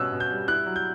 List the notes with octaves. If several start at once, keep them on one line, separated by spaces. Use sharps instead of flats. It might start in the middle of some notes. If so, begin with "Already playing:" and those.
Already playing: B2 G3 C#4 E6 F#6
B2
G6
G3
E4 F#6
F#3
G6